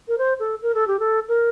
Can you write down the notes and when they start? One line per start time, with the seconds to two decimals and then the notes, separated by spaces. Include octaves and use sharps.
0.08 A#4
0.18 C5
0.40 A4
0.62 A#4
0.74 A4
0.88 G4
1.00 A4
1.28 A#4